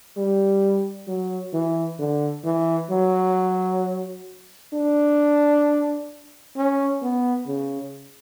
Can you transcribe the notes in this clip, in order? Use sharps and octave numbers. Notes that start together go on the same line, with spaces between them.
G3
F#3
E3
D3
E3
F#3
D4
C#4
B3
C#3